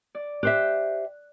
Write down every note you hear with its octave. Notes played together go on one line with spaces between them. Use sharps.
D5
G4 C5 E5 F#6